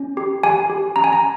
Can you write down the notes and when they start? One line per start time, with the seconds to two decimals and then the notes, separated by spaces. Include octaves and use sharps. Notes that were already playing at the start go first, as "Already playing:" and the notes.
Already playing: C#4
0.17 G4
0.44 G4 G#5
0.70 G4
0.96 C#4 A#5
1.04 G#5
1.13 A#5